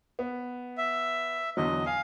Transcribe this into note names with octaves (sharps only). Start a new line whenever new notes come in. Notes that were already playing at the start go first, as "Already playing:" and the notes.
B3
E5
E2 D3 F#3 D#5
F5 G#5